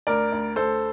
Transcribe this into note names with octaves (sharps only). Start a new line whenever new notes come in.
D2 A#4 D5
D2
D2 A4 C5